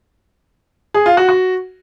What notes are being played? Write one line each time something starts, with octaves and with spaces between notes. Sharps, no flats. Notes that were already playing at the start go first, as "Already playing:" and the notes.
G#4
F4
F#4
F#4